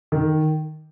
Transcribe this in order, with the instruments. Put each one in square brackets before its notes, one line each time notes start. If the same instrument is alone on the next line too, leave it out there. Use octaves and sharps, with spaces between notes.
[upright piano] D#3